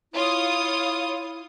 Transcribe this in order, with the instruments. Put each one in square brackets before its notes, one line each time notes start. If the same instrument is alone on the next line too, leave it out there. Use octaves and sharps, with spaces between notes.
[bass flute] E4 [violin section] F4 C#5 D#6